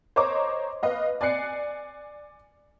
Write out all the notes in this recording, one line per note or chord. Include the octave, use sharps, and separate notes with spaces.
C5 C#5 D#5 A#5 C#6 D6
B4 D#5 F5
D5 G#5 F#6 C7 C#7